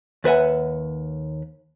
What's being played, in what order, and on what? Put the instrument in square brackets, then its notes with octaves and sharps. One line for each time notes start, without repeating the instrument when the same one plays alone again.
[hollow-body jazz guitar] D#2 B4 E5 F#5 G#5